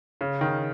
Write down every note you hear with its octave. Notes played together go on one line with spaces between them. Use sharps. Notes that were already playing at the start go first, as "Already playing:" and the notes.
C#3
D#3